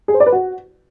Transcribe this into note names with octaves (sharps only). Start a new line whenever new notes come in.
G#4
C5
D5
B4
F#4